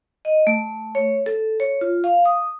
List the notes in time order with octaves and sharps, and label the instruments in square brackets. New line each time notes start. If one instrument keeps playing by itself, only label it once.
[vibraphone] D#5
A3
C#5
A4
C#5
F4
F5
D#6